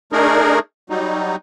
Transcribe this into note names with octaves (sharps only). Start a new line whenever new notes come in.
A3 D4 D#4 G#4 A#4
F#3 G3 D#4